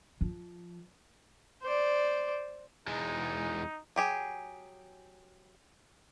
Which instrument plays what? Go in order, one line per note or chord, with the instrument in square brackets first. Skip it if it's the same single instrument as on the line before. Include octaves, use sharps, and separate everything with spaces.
[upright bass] F3
[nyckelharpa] C5 D5
[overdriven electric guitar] E2 G#3 [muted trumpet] D#4
[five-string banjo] F#3 G4 G#4